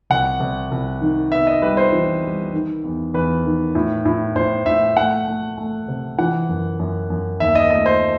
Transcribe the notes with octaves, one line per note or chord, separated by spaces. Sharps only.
C2 F#5
C2
C2
D#3
B3 E5
D#5
G3 B4
C5
E3
G3
D#3
E2
E2 B4
D#3
A2
A2
A2 C5
A2 E5
A3 F#5
A3
A3
C3
E3 F#5
F#2
F#2
F#2
D#2 E5
D#5
A3 D#5
C5